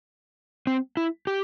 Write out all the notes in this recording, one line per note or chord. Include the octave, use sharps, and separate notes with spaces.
C4
E4
G4